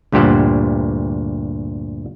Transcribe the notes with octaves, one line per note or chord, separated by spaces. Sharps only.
D2 G2 A#2 G4 C5 F#5